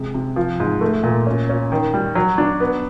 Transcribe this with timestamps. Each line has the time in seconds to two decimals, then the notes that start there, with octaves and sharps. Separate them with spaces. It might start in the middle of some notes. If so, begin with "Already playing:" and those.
Already playing: C3 G#3
0.14 C3
0.36 F3
0.60 G#2
0.81 A3
1.03 A#2
1.27 C#4
1.49 C#4
1.72 D#3
1.94 G3
2.15 F#3
2.38 D4
2.60 B3